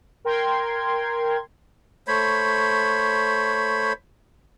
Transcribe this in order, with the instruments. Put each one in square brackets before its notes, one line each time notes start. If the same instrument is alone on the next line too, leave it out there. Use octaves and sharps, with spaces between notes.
[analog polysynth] A#4 G5 C6 G#6
[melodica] A3 C5 C#5 B5